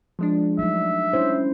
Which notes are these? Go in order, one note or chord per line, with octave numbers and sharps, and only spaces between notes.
F3 G#3 D4
F#3 A3 D#4 E5
C#4 D4 E4 C5